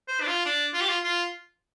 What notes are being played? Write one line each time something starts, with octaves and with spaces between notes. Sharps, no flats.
C5
D4
F4
D4
F4
G4
F4
F4